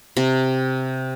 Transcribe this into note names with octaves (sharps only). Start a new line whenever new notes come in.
C3